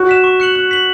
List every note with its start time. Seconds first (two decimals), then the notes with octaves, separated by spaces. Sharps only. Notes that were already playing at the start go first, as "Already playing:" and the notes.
Already playing: F#4
0.08 F#6 B6 E7
0.24 C#6
0.40 F#6 C#7 F#7
0.55 F#6
0.71 B6 F#7